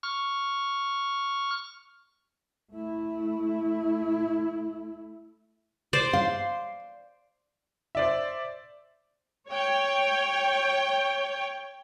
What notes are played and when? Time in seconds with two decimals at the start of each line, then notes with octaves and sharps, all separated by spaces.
0.03 C#6 F6
2.73 A3 E4
5.93 C5 D5
6.13 F5 C6
7.95 C5 D5 E5
9.49 C#5 G5